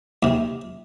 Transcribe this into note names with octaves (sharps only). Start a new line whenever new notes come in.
D#2 C3